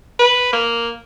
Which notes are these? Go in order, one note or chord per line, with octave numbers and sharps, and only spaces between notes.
B4
A#3